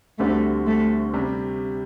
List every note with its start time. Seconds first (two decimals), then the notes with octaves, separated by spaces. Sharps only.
0.19 D2 D3 G3 A3 C4 F#4
0.67 A3
1.14 C3 G3